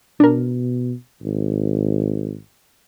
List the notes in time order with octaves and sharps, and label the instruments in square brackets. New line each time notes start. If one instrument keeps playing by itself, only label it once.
[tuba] B2 [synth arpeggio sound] D4 A#4
[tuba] G#1